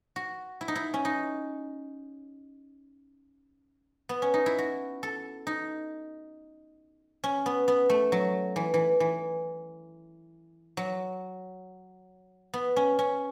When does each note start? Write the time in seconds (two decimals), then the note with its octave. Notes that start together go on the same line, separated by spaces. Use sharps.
0.16 F#4
0.61 E4
0.68 D#4
0.76 E4
0.94 C#4
1.05 D#4
4.09 B3
4.22 C#4
4.34 D#4
4.46 E4
4.58 F#4
5.03 A4
5.47 D#4
7.24 C#4
7.46 B3
7.68 B3
7.90 A3
8.12 F#3
8.56 E3
8.74 E3
9.00 E3
10.77 F#3
12.54 B3
12.76 C#4
12.99 C#4